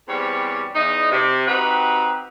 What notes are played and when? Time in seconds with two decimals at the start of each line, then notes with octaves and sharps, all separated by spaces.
0.08 E2 G3 C4 G4 C#5
0.75 E2 D#4
1.12 C3
1.48 C4 D#4 F#4 G4 B4